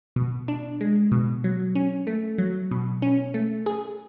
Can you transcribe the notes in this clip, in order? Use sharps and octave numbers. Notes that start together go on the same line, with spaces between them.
B2
D4
G#3
B2
F#3
C#4
A3
F#3
B2
C#4
A3
G#4